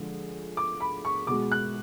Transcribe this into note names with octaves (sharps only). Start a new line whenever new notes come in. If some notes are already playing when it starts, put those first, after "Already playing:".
Already playing: D3 F3 G#3
D6
B5
C#6
B2 G#3 D6
F#6